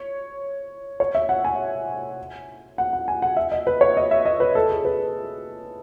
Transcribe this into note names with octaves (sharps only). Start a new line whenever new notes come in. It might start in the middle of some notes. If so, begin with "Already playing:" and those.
Already playing: C#5
C#5
E5
F#5
G#5
F#5
F#5
G#5
F#5
E5
D#5
B4
C#5
D#5
E5
D#5
B4
A4
G#4
B4